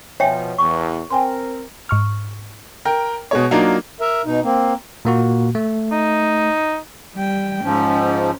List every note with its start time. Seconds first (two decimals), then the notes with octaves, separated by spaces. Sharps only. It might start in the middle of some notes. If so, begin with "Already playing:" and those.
0.20 B2 F3 C#5 E5 G5 G#5
0.58 E2 C#6
1.10 C4 A#4 G5 G#5 C6
1.89 G#2 C#6 F6
2.85 A#4 G5
3.31 B2 G#3 C#5
3.51 F#3 A#3 D4 D#4 F4
4.01 A#4 E5
4.26 B2 D#4
4.44 A#3 C4
5.05 A#2 A#3 F#4
5.55 A3
5.92 D#4
7.15 G3 G5
7.64 G#2 F3 C#4